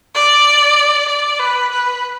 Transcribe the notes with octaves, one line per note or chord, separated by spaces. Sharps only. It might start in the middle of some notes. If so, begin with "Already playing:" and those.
D5
D5
B4
B4